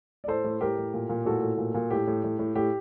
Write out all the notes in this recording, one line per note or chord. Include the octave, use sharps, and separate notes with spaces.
D5
A2 A4 C5
A2
A2 G4 A#4
A2
A#2
A#2
A2 F#4 A4
A2
A#2
A#2
A2 G4
A2
A2
A2
A2 G4